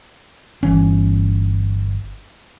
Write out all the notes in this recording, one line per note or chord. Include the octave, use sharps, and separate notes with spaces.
G1 E3 C#4